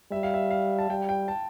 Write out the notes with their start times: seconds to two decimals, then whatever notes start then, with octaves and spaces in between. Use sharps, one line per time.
0.12 G3 E5
0.23 F5
0.34 E5
0.51 F5
0.79 A5
0.90 G3 G5
1.09 G5
1.28 A5